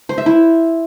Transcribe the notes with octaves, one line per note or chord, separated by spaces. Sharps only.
C5
E5
E4